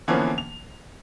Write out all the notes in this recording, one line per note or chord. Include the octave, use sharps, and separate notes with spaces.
D3 E3 F3 A#3 B3 C#4
F7